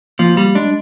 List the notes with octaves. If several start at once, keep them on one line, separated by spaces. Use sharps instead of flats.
F3 A#3
G3
G#3 D4